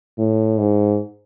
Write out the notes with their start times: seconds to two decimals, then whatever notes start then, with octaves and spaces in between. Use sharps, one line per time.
0.18 A2
0.59 G#2